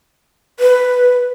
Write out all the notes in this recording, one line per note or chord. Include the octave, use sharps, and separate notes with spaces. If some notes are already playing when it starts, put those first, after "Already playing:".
B4